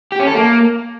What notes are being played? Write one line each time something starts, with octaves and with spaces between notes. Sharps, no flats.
G4
C#4
A4
A#3